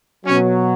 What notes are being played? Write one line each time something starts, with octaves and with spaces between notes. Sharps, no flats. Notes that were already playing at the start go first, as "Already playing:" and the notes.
B2 F#3 C#4